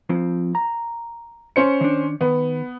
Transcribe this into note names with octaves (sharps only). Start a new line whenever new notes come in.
F2 F3 C4
A#5
C#4 C5 C#7
D#3 D4
D#3 B3